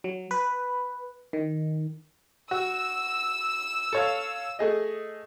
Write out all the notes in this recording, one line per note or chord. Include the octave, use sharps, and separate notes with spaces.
F#3
B4
D#3
F#4 E6
A4 C#5 F5
A3 G#4 D#5